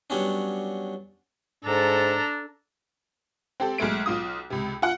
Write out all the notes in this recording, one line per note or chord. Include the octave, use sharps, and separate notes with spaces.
F#3 G3 B3 C#4 D4
G#2 D4 A4 A#5
C4 G4 A4
B1 G#3 A3 D7
B1 F4 D#6
C#2 C3
F4 F#5